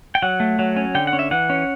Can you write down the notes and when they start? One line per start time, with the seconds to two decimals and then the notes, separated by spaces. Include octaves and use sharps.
0.15 G5
0.22 F#3 F#5
0.40 A3
0.59 F#3
0.76 C#4
0.95 D3 G5
1.07 F#5
1.13 C#4
1.19 E5
1.31 E3 F#5
1.50 C#4